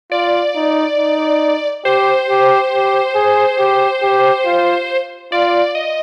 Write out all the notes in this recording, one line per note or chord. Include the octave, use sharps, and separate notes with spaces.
F4 D5
D#4
D#4
G4 C5
G4
G4
G#4
G4
G4
F4
F4 D5
D#5